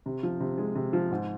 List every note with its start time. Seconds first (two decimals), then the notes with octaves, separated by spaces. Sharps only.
0.06 C3
0.23 F3
0.40 C3
0.58 G#3
0.75 C3
0.93 F3
1.11 G#2